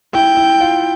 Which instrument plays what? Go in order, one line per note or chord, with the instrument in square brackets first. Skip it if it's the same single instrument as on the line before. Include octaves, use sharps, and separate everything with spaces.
[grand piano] E4 [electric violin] G5
[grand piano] E4
F4